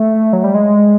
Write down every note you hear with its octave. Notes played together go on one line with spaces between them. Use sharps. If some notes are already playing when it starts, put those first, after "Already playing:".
Already playing: A3
F#3
G3
G#3